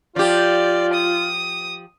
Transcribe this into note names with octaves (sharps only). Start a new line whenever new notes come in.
F3 F4 G4 D5
D#6